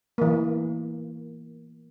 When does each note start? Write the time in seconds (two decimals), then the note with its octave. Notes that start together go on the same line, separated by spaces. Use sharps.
0.18 E3 A#3